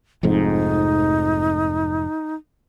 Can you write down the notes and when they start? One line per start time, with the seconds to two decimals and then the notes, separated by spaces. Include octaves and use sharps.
0.23 F1 F2 G#2 D#4